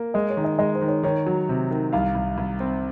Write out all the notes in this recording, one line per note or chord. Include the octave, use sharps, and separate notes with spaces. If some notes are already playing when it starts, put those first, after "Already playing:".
Already playing: A#3
G#3 D#5
C#5
D#3
D#5
G#3 D#5
C5
D#3
C#5
D#3 C#5
F#3
C3
D#3
C2 F5
C2
C2
C4